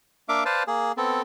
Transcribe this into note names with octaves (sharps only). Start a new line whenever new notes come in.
A#3 D4 E5 F5 D6
B4 C5 D5 F5 A5
A#3 G#4
B3 C4 A4